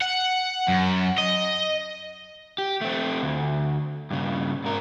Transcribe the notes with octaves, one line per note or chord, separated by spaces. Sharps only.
F#5
F#2
D#5
G4
A3 C4
D2
G2 C#3
G#2 A#4